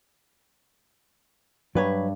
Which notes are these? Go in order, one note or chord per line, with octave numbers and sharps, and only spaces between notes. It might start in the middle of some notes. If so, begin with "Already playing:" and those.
G2 F#3 B4 C#5